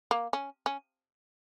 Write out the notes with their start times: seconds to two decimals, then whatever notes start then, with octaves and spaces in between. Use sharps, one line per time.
0.11 A#3
0.33 C#4
0.66 C#4